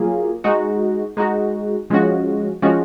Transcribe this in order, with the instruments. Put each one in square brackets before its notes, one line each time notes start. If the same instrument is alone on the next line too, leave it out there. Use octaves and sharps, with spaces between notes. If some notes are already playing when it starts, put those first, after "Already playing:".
Already playing: [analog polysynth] F#3 A#3 F4 G#4
G#3 D#4 F#4
G#3 D#4 F#4
F3 G#3 C#4 F#4
F3 G#3 C#4 F#4